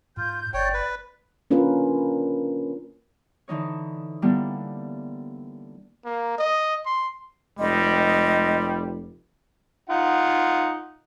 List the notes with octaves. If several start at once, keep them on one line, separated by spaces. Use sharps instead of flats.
G#2 F4 G6
G1 C#5 D5 G5
B4
A#3 C#4 D4 F4 A#4 B4
D3 E3 D#4 C#5
D3 G3 A#3 B3 D4 E4
A#3
D#5
C6
F1 G3 G#3 D#5
D#4 F4 F#5